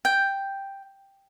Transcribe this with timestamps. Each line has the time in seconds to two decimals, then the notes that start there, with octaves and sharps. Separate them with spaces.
0.05 G5